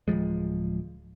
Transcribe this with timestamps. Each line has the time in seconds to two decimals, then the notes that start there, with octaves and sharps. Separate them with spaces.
0.08 D1 C2 F3 G#3